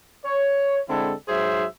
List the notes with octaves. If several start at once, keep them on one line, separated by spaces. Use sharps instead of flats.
C#5
D3 G#3 C4 E4 A4
G#2 F#3 G#4 C5 E5